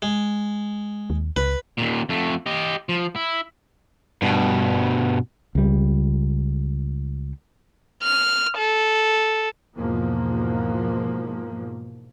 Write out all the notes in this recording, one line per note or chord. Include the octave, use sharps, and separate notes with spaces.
G#3
D#2
C#2 B4
D#2 A#2
F2 A3
G4 D#5
F3
E4
G2 B2
C#2 G3
F6
A4
E2 G#2 B2 F3 A#3